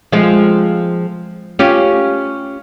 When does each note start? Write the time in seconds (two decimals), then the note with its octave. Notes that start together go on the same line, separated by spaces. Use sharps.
0.12 F3 G#3 C4
1.59 C#4 F4 G4